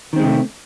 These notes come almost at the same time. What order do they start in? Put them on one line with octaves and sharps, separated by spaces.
D#3 C4 G#3 C3 A3